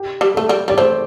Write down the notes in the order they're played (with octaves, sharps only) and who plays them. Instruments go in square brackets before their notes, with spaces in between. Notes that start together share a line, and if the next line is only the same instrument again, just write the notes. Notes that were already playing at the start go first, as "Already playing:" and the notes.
Already playing: [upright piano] G4
[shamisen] G3
[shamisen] A3 [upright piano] A4
[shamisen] G3
[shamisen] G3 [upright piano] D5
[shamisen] A3 [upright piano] C5